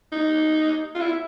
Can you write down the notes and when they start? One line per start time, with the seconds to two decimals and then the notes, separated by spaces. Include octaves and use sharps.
0.12 D#4
0.95 F4
1.01 E4